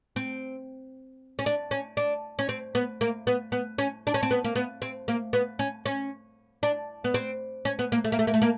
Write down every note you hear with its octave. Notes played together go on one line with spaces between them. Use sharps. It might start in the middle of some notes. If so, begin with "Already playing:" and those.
C4
C#4
D4
C#4
D4
C#4
C4
B3
A#3
B3
B3
C#4
D4
C#4
C4
B3
A#3
B3
C4
A#3
B3
C#4
C#4
D4
B3
C4
C#4
B3
A#3
A3
A#3
A3
A#3
A3
A#3